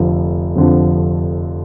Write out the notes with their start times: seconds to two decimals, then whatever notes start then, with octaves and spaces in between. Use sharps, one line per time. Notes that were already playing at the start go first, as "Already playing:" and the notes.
Already playing: F1 F2 D3 F3
0.56 F1 F2 D3 F3